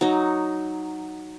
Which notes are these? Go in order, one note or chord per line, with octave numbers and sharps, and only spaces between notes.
F#3 D#4